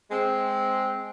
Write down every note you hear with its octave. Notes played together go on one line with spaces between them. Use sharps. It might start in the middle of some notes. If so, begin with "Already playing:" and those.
G#3 C4